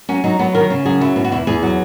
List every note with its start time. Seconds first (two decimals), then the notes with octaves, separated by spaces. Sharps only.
0.09 F#3 C#4
0.24 F#3 D#4
0.39 F#3 B3
0.55 D#3 A#4
0.70 C#3
0.85 F#2 G#4
1.01 F#3 E4
1.16 B2
1.24 F#4
1.32 E2 E4
1.47 E2 G#4
1.63 F#3